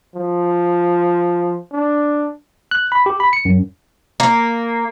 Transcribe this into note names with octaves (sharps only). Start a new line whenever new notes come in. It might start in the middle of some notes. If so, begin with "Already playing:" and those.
F3
D4
F#6
B5
G4
B5
C#7
F#2
A#3